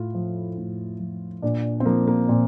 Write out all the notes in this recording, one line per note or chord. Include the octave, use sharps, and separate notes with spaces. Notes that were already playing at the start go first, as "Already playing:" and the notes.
Already playing: A2 F4
F3
A2
F3
A#2 D4
C4
F3 A#3
A#3
A#2 C4